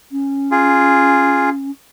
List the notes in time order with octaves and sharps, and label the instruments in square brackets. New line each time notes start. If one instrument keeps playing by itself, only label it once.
[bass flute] C#4
[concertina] F4 G#4